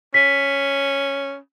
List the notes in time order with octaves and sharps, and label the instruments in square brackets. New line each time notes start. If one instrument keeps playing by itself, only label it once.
[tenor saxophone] C#4 [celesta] B6